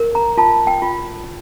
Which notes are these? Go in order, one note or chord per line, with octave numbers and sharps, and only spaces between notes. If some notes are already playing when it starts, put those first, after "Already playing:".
Already playing: A#4
A#5
F4 A5
G5
F4